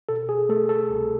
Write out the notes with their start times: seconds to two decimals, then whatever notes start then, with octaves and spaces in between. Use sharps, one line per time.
0.09 B2 A4
0.29 G#4
0.49 A3 A4
0.69 A4
0.90 C2